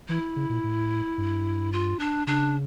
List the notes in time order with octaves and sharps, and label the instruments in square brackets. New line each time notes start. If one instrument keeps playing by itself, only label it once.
[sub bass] E3 [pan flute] E4
[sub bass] C#3
A#2
A2
G2
[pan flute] F4
D4
[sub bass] C#3 [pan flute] D4